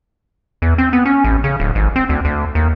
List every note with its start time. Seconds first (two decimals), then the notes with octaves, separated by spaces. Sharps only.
0.62 E2
0.78 C4
0.93 B3
1.05 C#4
1.24 A1
1.44 C#3
1.60 D1
1.75 G#1
1.96 C4
2.09 D2
2.25 D2
2.55 D#2